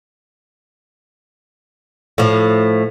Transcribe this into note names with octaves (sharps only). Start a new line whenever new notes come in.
A2 F3